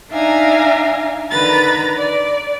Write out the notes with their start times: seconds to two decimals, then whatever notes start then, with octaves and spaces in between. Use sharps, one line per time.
0.10 D4 D#4 E5 F5 G#5 A#5
1.31 D3 D#3 B4 A#5 B5 A6
1.98 D5